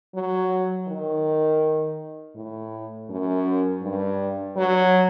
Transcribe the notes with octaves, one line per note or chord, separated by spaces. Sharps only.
F#3
D#3
A2
F#2
G2
F#3